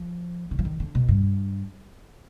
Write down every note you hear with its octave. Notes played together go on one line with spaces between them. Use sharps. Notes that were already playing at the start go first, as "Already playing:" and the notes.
Already playing: F3
D3
F3
D#3
D3
B2
G2